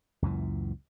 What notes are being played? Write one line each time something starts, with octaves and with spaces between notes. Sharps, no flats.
C#2 F#2 A#2 E3